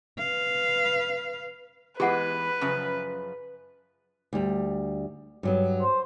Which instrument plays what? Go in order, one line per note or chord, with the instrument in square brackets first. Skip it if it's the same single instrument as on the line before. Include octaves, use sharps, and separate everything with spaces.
[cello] B4 F5
[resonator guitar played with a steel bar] E3 G#3 B3 [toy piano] G4 F#5 [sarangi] B4
[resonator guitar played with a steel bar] F#2 C#3 F3
[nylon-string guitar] D2 G3
G2 F#3 B3
[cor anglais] C5